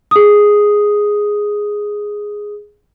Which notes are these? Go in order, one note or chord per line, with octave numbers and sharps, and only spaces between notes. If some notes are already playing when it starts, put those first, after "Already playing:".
G#4 D#6